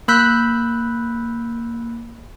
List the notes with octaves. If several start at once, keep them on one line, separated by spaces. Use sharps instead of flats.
A#3 B5 E6 F#6 G6 B6